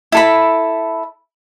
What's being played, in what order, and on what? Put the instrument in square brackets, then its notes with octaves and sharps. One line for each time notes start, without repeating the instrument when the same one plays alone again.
[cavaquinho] E4 A4 B5